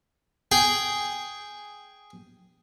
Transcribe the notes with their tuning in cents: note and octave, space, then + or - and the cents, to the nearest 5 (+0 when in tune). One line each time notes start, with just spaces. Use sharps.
G#4 +0 G5 +0